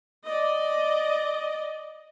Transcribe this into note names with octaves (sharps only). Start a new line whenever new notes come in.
D5 D#5